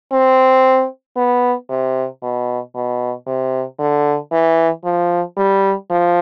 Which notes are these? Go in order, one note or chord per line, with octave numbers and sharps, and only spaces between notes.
C4
B3
C3
B2
B2
C3
D3
E3
F3
G3
F3